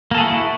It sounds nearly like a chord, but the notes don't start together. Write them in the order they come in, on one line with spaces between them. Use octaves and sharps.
A#3 A4 G#4 F#4 E4